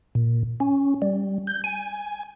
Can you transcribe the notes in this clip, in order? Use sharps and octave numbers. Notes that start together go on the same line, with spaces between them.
A#2
C#4
G3
G6
G#5